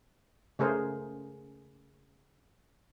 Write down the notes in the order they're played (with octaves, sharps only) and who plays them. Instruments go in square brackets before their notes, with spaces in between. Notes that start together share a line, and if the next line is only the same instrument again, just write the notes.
[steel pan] C#3 A3 G#4 A#4 C5